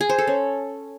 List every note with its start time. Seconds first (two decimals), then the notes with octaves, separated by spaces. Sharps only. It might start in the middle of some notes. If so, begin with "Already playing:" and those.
0.01 G#4
0.10 C5
0.18 A4
0.27 C#4